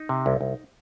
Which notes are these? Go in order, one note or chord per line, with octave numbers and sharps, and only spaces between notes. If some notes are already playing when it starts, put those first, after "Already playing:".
Already playing: D#4
C3
C2
C2